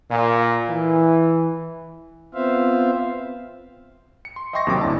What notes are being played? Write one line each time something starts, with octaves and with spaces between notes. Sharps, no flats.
A#2
E3
B3 C4 F4 C5 E5 F5
C#7
C6
D#5 E5 G5 C6 C#6 A#6
D#2 C3 F#3 C#4 D6 E6
G1 D2 E4 D5 A5